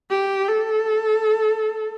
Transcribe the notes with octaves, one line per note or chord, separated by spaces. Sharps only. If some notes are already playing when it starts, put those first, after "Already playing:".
G4
A4